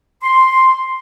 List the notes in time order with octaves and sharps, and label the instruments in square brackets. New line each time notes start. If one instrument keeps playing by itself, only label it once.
[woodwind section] C6